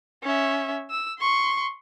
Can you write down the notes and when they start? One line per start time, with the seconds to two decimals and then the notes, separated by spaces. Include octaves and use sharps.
0.23 C#4 E5
0.91 E6
1.19 C6 C#6